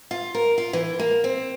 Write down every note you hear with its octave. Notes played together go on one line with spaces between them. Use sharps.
F4
A#4
F4
E3
A#3
C4